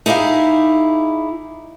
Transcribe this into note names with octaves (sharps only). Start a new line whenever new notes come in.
D#4 E4 G4 G#4 F5